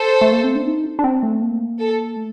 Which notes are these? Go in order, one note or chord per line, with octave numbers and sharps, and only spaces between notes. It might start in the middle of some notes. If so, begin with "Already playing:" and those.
Already playing: A4 C5
A3
A#3
C4
D4
D#4
D4
C4
A3
A#3
A4
A3